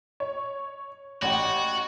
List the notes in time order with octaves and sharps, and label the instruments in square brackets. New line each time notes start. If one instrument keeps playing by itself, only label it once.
[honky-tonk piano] C#5
[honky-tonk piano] A1 F#5 G5 [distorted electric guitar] F#4